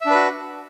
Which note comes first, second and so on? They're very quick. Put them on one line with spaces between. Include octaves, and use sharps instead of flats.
E5 D4 B4 F#4